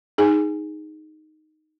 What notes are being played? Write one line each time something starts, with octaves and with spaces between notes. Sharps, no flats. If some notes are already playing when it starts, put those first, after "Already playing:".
D#4 G#4 G#5